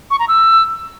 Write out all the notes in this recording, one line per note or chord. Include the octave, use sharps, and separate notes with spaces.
C#6
A#5
E6